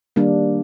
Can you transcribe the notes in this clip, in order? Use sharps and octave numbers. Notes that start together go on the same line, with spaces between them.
D#3 G3 A#3 D4